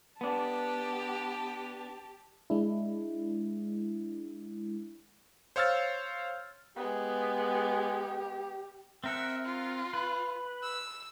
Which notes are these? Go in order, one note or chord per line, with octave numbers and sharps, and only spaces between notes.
B3 D4 G4 A5
G#3 D4 E4
C5 C#5 F5 E6 F6 A6
G#3 B3 G4
C4 A#4 E5 F#5
F4
B4
E6